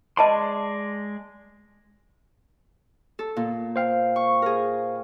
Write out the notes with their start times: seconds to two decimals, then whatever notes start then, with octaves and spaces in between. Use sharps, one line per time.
0.17 G#3 D5 D#5 A5 B5 C6
3.19 A4
3.37 A#2
3.76 C5 F5 G5
4.16 C#6
4.42 G#4 A#4